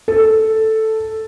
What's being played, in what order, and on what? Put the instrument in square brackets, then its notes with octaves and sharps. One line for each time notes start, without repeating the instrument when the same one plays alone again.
[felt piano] A4